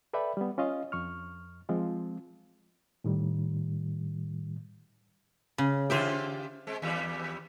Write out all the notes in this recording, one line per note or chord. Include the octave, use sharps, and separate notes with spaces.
A4 B4 D5 E5 G5 B5
G3 B3
C#4 F4 D#5 F5
F2 C#6 F6
F3 G#3 C4 F4
A2 D#3 G3
C#3
C#3 F4 G4 C5 E5 G5
G#3 C4
D#2 G3